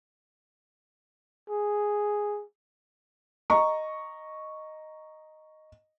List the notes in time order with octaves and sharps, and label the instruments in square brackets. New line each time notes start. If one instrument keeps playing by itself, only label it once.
[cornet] G#4
[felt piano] D#5 A#5 C#6